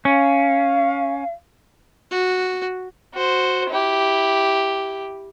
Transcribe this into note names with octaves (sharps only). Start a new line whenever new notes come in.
C#4 F5
F#4
F#4 C5
E4 G4